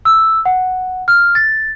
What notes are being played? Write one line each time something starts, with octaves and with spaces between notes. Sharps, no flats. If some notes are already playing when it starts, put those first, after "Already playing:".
E6
F#5
F6
A6